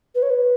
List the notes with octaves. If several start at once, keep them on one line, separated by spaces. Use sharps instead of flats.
B4
C#5
B4